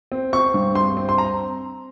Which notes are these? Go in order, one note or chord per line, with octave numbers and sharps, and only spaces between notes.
C4
C4 C#6
G2
G2 C6
C4
C6
A#5